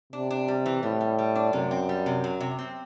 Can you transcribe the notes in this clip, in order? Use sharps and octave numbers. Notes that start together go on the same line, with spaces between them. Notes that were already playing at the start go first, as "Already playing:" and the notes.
C3 D4
D4
G3
E3
A2 G3
G3
G3
D4
F#2 C3
C4
G3
C3
F#3
C3
C4